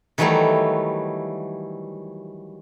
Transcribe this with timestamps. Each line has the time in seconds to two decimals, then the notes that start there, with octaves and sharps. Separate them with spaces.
0.18 D#3 E3 F#3 G3 A3 E4